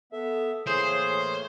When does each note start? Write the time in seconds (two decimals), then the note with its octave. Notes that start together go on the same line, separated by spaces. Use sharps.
0.13 B3 A4 E5
0.67 A2 E3 A#3 G#4 C5 C#5